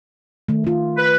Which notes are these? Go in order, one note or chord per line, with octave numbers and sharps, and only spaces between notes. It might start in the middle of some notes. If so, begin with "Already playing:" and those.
D#3 A3
A3 F4
B4